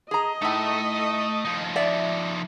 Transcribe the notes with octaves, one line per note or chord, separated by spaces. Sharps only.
G#4 D#5 A#5
A2 A3 D#4 E5
F3 D#4
D5 E5